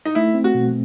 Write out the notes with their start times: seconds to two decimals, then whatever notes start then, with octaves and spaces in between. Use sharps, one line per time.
0.05 D#4
0.15 A3 E4
0.34 C4
0.44 F#4
0.54 B2